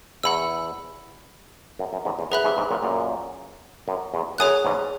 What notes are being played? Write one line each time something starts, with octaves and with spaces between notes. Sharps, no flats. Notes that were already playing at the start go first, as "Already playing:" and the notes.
E2 F#5 B5 E6
F#2
F#2
E2 G#2
E2
F#2 G#4 B4 E5 B5 F#6
E2 G#2
E2 G#2
F#2 A#2
F#2 A#2
F#2
E2
F#2 G#4 C#5 G#5 D#6 F#6
E2 G#2